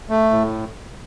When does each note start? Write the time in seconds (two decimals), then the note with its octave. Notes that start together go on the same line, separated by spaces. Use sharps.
0.09 A3
0.31 A2